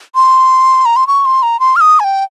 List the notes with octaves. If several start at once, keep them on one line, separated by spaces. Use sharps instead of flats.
C6
A#5
C6
C#6
C6
A#5
C6
F6
D#6
G#5
G5